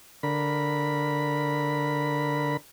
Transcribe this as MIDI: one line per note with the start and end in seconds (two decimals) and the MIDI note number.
0.23 2.57 50
0.23 2.57 70
0.23 2.57 83